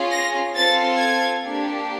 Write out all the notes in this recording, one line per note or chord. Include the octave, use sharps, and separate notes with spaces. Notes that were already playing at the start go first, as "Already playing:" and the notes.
Already playing: C#4 F4 G#4
A#6
C4 F4 A4 A6
G#6
A#3 D4 G4